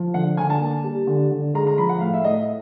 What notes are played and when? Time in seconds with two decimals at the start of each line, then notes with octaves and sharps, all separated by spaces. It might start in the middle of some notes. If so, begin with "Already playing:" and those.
Already playing: F3
0.14 D3 F#5
0.37 D3 G#5
0.50 A5
0.60 A#3
0.84 G3
1.07 D3
1.31 D3
1.54 G#3 A#5
1.67 A#5
1.78 F3 B5
1.89 F#5
2.01 A2 F5
2.14 E5
2.24 A2 D#5